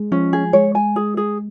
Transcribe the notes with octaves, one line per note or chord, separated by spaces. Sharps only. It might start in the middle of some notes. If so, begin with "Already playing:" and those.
Already playing: G#3
F3 C#4
G#4
G#3 C#5
G#5
G#4
G#4